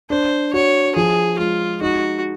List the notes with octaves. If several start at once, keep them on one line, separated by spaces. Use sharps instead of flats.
D4 C5
F#4 C#5
F3 G#4
G#3 F4
D#4 F#4